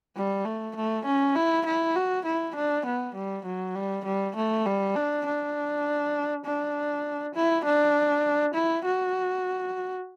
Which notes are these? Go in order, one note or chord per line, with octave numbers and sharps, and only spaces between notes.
G3
A3
A3
C#4
E4
E4
F#4
E4
D4
B3
G3
F#3
G3
G3
A3
G3
D4
D4
D4
E4
D4
E4
F#4